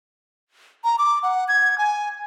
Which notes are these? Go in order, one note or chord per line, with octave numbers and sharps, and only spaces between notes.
A#5
D6
F#5
G#6
G#5